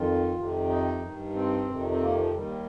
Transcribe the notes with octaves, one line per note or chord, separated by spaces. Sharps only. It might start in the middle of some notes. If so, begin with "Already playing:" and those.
Already playing: F2 D#3 F4
F2 C3 D#3
D#4
G2 D#3
C4
F2 C3 D#3
C4
A#3
F3
D#2 D#3 G3